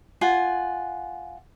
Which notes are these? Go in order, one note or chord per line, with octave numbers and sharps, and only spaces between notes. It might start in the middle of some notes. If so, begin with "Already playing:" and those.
F4 F#5 G#5